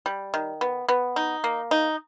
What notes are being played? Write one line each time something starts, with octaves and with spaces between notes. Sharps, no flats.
G3
D#3
B3
B3
D#4
A#3
D#4